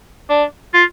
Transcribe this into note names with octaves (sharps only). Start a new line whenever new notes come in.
D4
F4